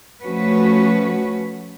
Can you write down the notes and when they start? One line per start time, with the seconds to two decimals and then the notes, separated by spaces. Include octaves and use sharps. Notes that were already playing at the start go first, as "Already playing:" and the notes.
0.21 F3 A3 C#4 F#4 B4